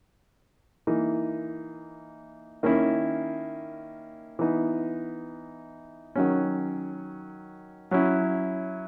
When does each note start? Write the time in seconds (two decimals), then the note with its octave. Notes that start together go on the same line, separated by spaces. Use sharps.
0.87 E3 A#3 D#4
2.63 D#3 A#3 C#4 E4
4.39 E3 B3 D#4
6.16 D#3 F#3 C#4
7.91 F#3 C#4 E4